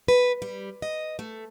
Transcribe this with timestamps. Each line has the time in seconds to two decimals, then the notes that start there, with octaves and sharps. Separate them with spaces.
0.08 B4
0.42 G3
0.82 D#5
1.19 A3